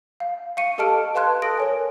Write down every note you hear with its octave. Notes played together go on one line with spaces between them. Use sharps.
F5
F5 C#6 C#7 D#7
G4 A4 D#5 A5 F6 D7
B4 F5 A5 C6 F#6 G#6
A4 D#6 A#6 D7
A#4 C#5 G#5